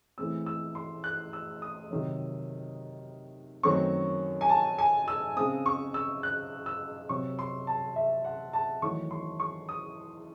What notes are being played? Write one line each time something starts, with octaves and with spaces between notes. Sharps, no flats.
A2 E3 G#3 C4 E6
E6
C6
F#6
E6
D#6
C3 D#3 F#3
F#2 D#3 F#3 A3 C4 C#6
G#5
A5
G#5
E6
C#3 G#3 C4 D#6
C#6
E6
F#6
E6
C3 F#3 C4 C#6
C6
A5
E5
F#5
A5
E2 D#3 F#3 A3 C#6
C6
C#6
D#6